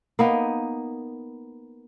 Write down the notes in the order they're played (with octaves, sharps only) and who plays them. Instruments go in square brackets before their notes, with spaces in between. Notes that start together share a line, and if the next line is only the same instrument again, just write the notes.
[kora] A#3 B3 D#4